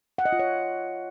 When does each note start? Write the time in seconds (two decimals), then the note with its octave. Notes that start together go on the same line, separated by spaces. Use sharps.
0.18 F#5
0.25 D#5
0.32 F4
0.39 C#5